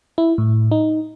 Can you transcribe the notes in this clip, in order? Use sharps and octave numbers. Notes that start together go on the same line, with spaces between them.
E4
A2
D#4